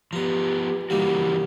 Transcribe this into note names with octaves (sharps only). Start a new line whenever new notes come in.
F3 B3 G4 A#5 D#6
C#3 E3 G3 A#3 D#4 F#4